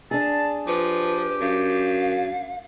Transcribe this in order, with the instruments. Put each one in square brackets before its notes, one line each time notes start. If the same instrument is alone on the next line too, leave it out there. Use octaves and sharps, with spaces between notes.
[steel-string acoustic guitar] D4 G#4 [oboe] A5
[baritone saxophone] F3 [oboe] G4 [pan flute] B4
[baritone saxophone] F#2 [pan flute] F5